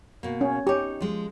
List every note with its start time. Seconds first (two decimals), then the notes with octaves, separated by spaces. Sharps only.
0.23 B2 A#3
0.41 C#4
0.67 D#4 G4 C#5
1.01 F3 G#3